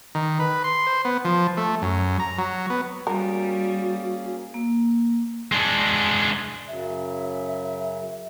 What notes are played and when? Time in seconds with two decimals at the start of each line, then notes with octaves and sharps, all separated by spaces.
0.15 D#3
0.40 B4
0.64 C6
0.87 C5
1.05 B3
1.25 F3
1.57 A3
1.82 F#2
2.20 A#5
2.38 F#3
2.70 B3
3.07 G3 A#3 C#4 F#4 G#4 A#4
4.54 A#3
5.52 G#3 D4
6.67 F#2 C#3 F#3 E5